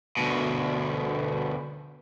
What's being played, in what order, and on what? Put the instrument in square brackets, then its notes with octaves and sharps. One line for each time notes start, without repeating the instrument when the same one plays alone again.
[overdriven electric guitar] D2 B2